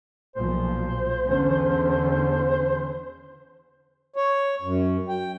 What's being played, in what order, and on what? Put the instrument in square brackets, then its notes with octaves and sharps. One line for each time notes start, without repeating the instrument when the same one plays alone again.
[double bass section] B1 A#2 F3 [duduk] C5
[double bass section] E2 D3 C#4
[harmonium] C#5
F#2
G5